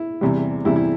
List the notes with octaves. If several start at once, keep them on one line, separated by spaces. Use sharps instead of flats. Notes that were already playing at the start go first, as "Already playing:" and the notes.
Already playing: E4
E2 C3 G3
E2 C3 G3 E4
E4